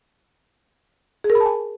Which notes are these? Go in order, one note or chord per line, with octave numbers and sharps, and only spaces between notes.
G#4
A#4
B5
A5
G#5